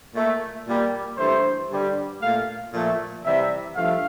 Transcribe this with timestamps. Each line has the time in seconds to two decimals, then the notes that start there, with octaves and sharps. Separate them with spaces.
0.14 A#2 A3
0.67 A#2 G3
1.17 G2 E3 A3 C5
1.69 G2 D3 G3
2.21 A#2 A3 F5
2.72 A#2 F3 A3
3.24 C3 E3 G3 E5
3.75 G2 F3 A3 F5